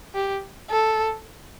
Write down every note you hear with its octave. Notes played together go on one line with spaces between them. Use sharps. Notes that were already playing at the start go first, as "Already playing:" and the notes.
G4
A4